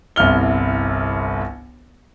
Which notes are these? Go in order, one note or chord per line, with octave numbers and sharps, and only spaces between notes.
G1 C2 E4 F6 G7